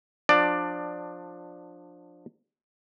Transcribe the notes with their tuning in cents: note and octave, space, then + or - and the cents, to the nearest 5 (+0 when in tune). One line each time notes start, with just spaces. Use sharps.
F3 +20 D4 +20 D5 +15